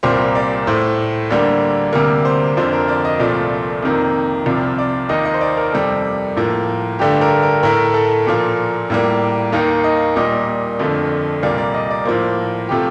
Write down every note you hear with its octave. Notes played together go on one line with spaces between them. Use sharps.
C2 A#2 G3 A#3 C5
D5
A2 A3 C5
D2 D3 G3 A#3
D2 C3 G3 A#3 A#4
C5
F2 D3 F3 C5
A#4
D5
D#5
C2 A#2 F3 A3 D5
F2 C3 D#3 A#3
C2 C3 F3 D5
D5
D#2 D#3 A#3 D#5
D#5
C5
D5
A#4
F2 C3 G3 A4
A2 F3 A#3
G2 D3 A3 G4
A#4
A#4
A2 A3 A#4
A4
A#2 F3 A#3
A2 G3 A#3
D#2 D#3 A#3 F5
D#5
A#2 G3 A#3 D#5
F2 D3 F3 A3
C2 A#2 G3 A#3 D5
D5
D#5
D5
A2 F3 A#3 C5
C3 F3 A3 G4